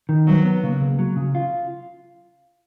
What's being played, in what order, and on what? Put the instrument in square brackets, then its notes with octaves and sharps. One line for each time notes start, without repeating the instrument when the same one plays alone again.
[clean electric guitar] D#3
[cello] F#3 [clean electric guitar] B3
[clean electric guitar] B3
[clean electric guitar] C#3 [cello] A#3
[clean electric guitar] C#2
F#3
C#3
F4